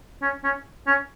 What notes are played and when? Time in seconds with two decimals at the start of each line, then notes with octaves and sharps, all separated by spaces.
0.22 C#4
0.44 C#4
0.87 C#4